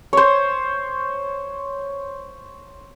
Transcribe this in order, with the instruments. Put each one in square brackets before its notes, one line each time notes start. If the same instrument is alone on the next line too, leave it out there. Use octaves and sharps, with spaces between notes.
[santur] C5 C#5